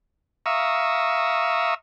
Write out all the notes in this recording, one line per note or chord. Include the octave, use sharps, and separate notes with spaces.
E5 F5 A#5 C#6 D#6 E6